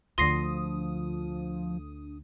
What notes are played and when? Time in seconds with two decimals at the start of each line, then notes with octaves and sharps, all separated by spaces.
0.18 D2 D3 F3 C6 D#6 A#6 C7